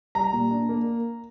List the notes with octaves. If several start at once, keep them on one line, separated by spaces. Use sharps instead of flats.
G3 A#5
A#2
D4
A#3